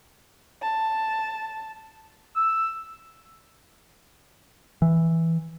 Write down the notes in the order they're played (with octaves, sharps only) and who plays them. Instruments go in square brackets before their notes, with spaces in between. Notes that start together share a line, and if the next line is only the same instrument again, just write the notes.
[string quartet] A5
[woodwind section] E6
[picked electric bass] E3